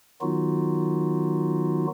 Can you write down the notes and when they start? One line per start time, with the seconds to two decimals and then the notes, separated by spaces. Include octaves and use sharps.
0.21 D#3 F#3 B3 D#4 F4 F#4